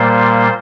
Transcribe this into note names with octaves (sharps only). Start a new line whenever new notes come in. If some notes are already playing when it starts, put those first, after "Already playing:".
Already playing: A#2 G3 A#3 C5